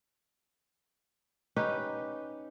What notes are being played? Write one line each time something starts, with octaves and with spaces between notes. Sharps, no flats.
C#4 D#4 G4 B4